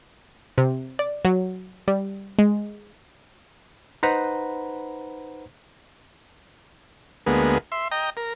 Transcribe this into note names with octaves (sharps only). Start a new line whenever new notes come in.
C3
D5
F#3
G3
G#3
D#4 B4 C5 F#5 A#5 B5
D2 G#3 A#3 B3
E5 C6
D#5 G5 A#5
A#4